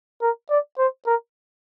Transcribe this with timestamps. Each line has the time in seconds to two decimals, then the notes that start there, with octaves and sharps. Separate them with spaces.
0.22 A#4
0.50 D5
0.78 C5
1.06 A#4